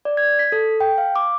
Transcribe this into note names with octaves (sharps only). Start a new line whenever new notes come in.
D5
G#6
B6
A4
G5
F5
D6